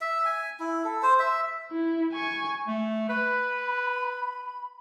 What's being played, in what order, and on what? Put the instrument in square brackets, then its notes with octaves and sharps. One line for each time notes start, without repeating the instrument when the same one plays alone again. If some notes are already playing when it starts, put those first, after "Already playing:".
[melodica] E5
G#5
E4
A4
C5
E5
[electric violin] E4
G#5 C#6
[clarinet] A3
[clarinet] B4 [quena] B5